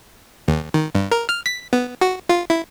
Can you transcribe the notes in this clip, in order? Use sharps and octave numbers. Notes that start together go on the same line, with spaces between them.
D#2
D#3
G2
A#4
F6
B6
B3
F#4
F4
E4